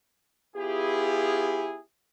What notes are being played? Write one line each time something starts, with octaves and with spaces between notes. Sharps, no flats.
B3 E4 F4 G4 G#4